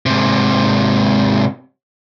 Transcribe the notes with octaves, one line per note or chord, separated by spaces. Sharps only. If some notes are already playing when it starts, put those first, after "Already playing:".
G#2 C3